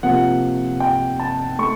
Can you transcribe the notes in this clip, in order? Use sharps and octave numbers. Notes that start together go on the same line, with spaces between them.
C3 F3 A#3 F#5
G5
A5
A3 C#6